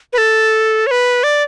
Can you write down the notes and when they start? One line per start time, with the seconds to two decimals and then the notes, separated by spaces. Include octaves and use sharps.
0.13 B4
0.18 A4
0.87 C#5
0.91 B4
1.23 D5